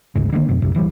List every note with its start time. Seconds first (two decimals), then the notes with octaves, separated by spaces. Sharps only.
0.15 G1 D2 G#2 C#3
0.33 D3 D#3 F#3 A#3
0.49 F2 B2
0.62 B1 F#2 C3
0.75 D1 E3 F3 G3